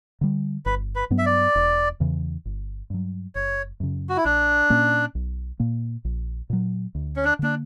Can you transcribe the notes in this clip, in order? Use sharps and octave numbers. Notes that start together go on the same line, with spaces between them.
D3 G3
G1 B4
B4
G2 F#3 B3
E5
D5
E1
E2 C#3 E3
G1
G2 F#3
F#1 C#5
F#2 C#3
F#4
E4
A#1 D4
A#2 A#3 C#4
B1
A#2 A#3
A#1
A#2 F#3
D2
C#4
D4
D3 A#3 D4